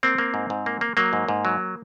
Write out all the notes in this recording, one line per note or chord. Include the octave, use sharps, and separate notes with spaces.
A#3 C4
A#3
G#2
G#2
A#3
A#3
F#3 A#3
G#2
G#2
F#3